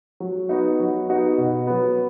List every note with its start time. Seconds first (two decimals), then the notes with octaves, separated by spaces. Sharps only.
0.20 F#3
0.49 B3 D#4 F#4
0.79 F#3
1.08 B3 D#4 F#4
1.38 B2
1.67 F#3 B3